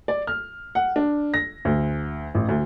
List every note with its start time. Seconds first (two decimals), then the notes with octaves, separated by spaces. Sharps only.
0.08 D5
0.27 F6
0.75 F#5
0.96 D4
1.34 A#6
1.65 D2
2.35 A1
2.49 D2